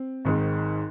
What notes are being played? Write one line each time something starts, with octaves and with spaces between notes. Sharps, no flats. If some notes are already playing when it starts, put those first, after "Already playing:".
Already playing: C4
G#1 G#2 D#3 G#3 D#4